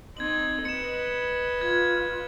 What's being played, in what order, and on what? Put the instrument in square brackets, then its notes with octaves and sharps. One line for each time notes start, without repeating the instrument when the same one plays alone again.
[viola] C4 D#4 [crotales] G#6 F#7
[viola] B4 D#5 [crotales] C#7 E7
[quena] F4 [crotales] G#6